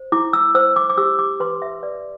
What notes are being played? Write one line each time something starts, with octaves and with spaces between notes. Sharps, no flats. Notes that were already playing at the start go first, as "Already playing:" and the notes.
Already playing: C5
E4 D6
E6
C5 E6
D6
D6
G4 E6
D6
B4 C6
E5
B4 D5